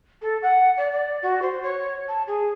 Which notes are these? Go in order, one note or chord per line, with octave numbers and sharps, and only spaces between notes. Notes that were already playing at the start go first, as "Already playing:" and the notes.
A4
F#5
D5
D5
F#4
C5
C#5
A5
G#4